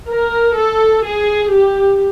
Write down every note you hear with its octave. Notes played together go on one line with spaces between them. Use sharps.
A#4
A4
G#4
G4